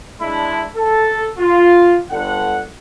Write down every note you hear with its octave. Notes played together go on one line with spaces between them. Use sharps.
G#3 D4 E4
A4
F4
G1 D3 F#5